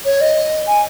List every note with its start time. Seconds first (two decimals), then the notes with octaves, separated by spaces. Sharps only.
0.05 C#5
0.21 D#5
0.67 G#5